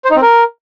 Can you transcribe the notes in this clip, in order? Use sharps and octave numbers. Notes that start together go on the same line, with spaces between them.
C5
D#4
C4
A#4